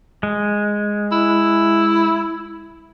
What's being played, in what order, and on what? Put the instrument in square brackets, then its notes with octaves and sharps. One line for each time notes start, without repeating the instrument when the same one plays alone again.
[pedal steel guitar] G#3
[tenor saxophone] E4